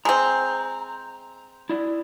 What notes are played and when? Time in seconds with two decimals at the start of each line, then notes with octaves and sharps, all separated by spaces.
0.05 G#3 C4 A#5
1.69 E4 D5